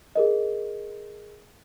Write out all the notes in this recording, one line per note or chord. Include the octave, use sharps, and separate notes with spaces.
G#4 A#4 D#5